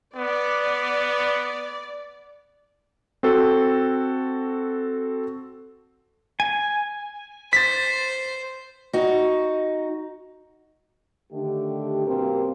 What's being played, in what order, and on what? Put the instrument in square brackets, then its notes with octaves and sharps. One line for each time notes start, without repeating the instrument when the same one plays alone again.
[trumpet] B3 [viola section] D5
[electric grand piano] C4 F#4 A4
[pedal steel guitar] G#5
[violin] C5 [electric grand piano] A6 B6
[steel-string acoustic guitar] D#4 F#4
[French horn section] D3 D#3 A3 D4 G4
F#2 B2 A#3 C4 G4 A#4